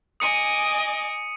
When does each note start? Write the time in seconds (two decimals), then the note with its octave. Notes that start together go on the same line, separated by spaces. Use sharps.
0.20 D#5 G#5 D6 D#6 C#7 D#7